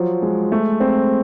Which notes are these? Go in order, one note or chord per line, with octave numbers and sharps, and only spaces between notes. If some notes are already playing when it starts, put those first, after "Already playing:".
Already playing: F3 F#3
G#3
A3
C4